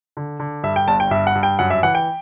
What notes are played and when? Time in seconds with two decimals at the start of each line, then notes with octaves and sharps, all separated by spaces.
0.17 D3
0.40 D3
0.63 G2 E5
0.76 G5
0.88 G1 A5
1.00 G5
1.11 G2 E5
1.27 F#5
1.35 G2
1.43 G5
1.59 F#2 F#5
1.70 E5
1.83 E3 F#5
1.95 G5